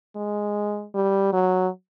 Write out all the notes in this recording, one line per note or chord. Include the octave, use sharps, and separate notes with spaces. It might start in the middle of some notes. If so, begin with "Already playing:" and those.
G#3
G3
F#3